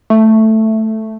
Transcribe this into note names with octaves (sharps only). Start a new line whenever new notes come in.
A3